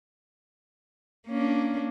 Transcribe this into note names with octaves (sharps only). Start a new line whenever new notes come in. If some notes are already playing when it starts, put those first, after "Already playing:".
A#3 C#4 D4